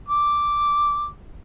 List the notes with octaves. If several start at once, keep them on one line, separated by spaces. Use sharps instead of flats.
D6